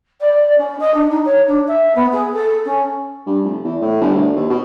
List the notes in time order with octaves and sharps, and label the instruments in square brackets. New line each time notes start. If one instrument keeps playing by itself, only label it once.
[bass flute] D5
C#4
D#5
D4
D#4
C#5
D4
E5
B3
G#4
A4
C#4
[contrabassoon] G2
F1
E2
A2
G1
D2
D#2
B2